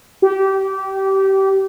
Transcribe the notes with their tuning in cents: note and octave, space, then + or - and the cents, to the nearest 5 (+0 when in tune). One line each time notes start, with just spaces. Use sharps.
G4 -25